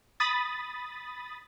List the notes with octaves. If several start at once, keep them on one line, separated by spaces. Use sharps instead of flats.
B5 D#6 A6